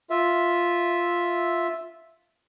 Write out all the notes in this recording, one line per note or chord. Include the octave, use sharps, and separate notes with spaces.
F4 E5